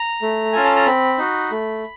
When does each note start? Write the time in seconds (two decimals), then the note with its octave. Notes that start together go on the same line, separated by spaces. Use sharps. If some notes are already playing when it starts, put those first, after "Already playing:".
Already playing: A#5
0.22 A3
0.52 C#4 F4 A4 G#5
0.64 A5
0.75 A#5
0.87 C4 B5
1.18 D#4 F#4
1.51 A3